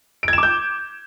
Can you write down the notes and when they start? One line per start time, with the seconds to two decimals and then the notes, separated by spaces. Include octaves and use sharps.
0.23 D7
0.28 G#6
0.33 E7
0.38 D6
0.43 G6